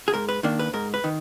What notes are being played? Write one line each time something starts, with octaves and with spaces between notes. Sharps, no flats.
G#4
G#2 A#4
B4
D#3 A#3 D4
B4
G#2 A#4
B4
D#3